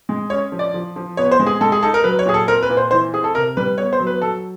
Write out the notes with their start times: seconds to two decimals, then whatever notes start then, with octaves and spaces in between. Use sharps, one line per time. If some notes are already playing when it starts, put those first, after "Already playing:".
0.09 G#3
0.30 C#4 C#5
0.52 F3
0.59 D5
0.74 F3
0.96 F3
1.17 B3 C#5
1.31 C5
1.40 G#3
1.46 G#4
1.61 G#3 A4
1.72 G#4
1.83 D#4 A4
1.94 A#4
2.04 F#3 B4
2.19 C#5
2.26 A#2 G#4
2.34 A4
2.47 C4 A#4
2.63 B4
2.69 A#2
2.77 C5
2.91 E3 C5
3.13 C4 G#4
3.24 A4
3.35 C3 A#4
3.57 G3 B4
3.78 B3 C#5
3.93 C5
3.99 F#3
4.07 B4
4.22 F#3 A4